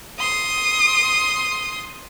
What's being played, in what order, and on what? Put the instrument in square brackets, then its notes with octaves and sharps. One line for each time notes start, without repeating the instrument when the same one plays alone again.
[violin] C6 D#6